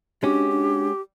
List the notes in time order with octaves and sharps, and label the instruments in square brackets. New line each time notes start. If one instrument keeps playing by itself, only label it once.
[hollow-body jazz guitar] G#3 C#4 F#4 [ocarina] D4 [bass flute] G4
[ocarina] D4